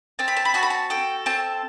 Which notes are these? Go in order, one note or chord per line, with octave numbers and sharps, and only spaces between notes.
C4 A5
B5
A5
B5
F#4 A5
B5
A5
A4 G5
C4 A5